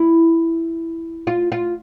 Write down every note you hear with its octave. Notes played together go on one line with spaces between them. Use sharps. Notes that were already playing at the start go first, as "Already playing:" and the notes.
Already playing: E4
F4
F4